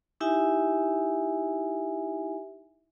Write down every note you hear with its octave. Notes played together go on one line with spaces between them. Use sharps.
D#4 E4 G4 E5 G#5